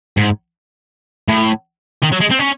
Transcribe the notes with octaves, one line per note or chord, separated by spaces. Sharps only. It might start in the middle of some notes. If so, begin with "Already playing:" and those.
G#2
A2
D#3
F#3
G#3
C4
C#4